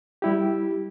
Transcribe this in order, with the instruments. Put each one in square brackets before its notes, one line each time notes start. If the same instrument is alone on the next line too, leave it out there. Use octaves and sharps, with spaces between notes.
[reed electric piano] G3 E4 G4